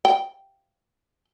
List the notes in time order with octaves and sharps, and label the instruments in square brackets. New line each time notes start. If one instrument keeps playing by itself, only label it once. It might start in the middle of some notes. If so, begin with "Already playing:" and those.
[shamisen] G5